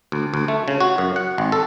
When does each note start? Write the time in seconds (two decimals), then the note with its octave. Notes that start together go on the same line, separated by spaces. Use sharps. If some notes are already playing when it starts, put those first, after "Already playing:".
0.12 D2
0.34 D2
0.48 A3
0.68 C#3
0.80 F#4
0.98 F#2
1.16 F#5
1.38 G#1
1.52 A4